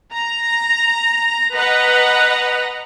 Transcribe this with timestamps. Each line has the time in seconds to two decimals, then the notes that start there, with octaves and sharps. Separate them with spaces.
0.14 A#5
1.54 B4 D#5 F#5 A#5